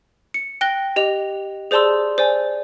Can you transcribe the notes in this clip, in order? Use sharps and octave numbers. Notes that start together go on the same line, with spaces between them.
C#7
G5 F#6 A#6 G7
G4 D#5 F7
G#4 C5 D5 A5 C6 E6
C5 D5 G#5